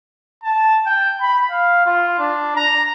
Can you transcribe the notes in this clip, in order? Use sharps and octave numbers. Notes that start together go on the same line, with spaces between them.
A5
G5
B5
F5
F4
D4
A#5